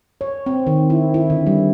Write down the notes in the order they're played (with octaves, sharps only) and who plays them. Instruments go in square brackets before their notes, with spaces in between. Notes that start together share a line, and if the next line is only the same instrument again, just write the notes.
[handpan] C#5
C4
D#3
E4
E4
D3
G3